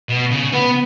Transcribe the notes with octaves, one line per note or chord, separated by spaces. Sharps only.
B2
C#3
B3